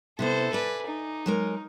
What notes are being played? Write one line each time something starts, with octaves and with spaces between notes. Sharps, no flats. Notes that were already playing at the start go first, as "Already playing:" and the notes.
C3 B3 E4 A4 C5
B4 D5 G#5
D#4
F#3 G#3 A#4